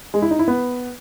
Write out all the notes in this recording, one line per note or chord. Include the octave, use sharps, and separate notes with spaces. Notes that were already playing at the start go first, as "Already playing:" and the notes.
G#3
E4
D#4
E4
B3